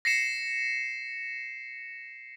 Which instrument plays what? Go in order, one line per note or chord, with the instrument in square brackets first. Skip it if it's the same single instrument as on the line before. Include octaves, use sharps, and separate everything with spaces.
[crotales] A#6 C7 C#7 E7